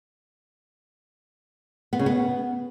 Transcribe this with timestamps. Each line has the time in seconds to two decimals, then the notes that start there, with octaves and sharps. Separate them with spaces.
1.93 B3
1.99 C#3
2.06 B3